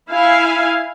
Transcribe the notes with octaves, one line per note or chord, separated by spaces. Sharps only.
E4 F5 G#5